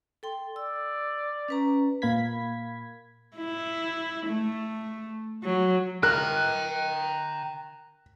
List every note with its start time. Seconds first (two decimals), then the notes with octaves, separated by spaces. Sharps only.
0.23 A4 G5 C6
0.56 D5 E6
1.49 C#4 B4 A#5
2.02 A#2 A#3 F5 B5 G#6 B6
3.36 E4
4.27 A3
5.44 F#3
6.03 A#4 G5 A#5 F#6